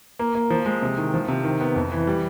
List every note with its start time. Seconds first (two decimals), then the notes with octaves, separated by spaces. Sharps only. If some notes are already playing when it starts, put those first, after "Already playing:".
0.19 A#3
0.35 A#3
0.50 F3
0.66 G#3
0.82 C3
0.98 D#3
1.14 F3
1.28 C3
1.44 D#3
1.60 B3
1.76 F2
1.92 E3
2.07 G3